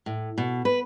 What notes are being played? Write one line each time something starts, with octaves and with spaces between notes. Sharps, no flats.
A2
B2
B4